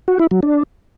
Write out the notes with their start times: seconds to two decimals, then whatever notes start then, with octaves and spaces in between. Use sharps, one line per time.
0.08 F#4
0.19 E4
0.31 F#3
0.43 D4